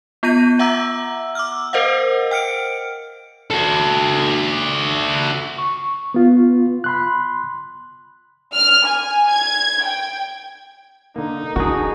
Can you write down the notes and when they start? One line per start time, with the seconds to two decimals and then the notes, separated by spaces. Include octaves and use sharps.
0.23 B3 F4 G6 A#6 D#7
0.59 E5 F#5 A#5 D6 E6
1.35 D6 E6 F6
1.73 A#4 C5 D#5 F5 F#5
2.31 G5 F6 C#7 D7
3.51 F#4 A4
5.58 C#6
6.14 B3 F4
6.84 B5 C6 F#6
8.55 F6
8.87 G#5
9.30 G#6
9.85 G5
11.16 D3 A#3 D#4
11.56 D3 E4 F#4 G#4 A#4 A5